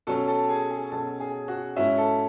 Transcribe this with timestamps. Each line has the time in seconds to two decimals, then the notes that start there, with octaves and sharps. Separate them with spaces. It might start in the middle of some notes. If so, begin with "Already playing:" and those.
0.07 B2 F#3 C#4 A4 A5
0.28 A4 A5
0.49 G#4 G#5
0.70 G#4 G#5
0.92 B2 F#3 C#4 A4 A5
1.20 G#4 G#5
1.48 F#4 F#5
1.76 G#2 F#3 C#4 E4 E5
1.98 A4